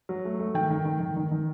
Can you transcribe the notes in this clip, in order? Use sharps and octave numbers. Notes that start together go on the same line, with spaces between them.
F#3
A3
A3
D#3 G5
D#3
D#3
D#3
D#3
D#3